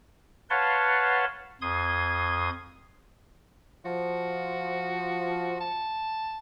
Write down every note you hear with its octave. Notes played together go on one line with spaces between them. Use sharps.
B4 C#5 F5 F#5 A5 C6
F2 C6 D#6 G#6
F3 F#4
A5